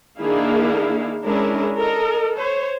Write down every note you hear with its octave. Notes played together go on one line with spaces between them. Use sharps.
D#3 A#3 D4 E4 G#4 F5
G#3 C#4 D4 E4 G#4 A#4
A4 A#4 D#5
C5 C#5